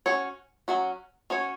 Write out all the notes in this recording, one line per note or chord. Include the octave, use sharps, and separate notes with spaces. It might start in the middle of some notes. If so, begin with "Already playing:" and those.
C#4 F#4 C#5
F#3 C#4 F#4
C#4 F#4 C#5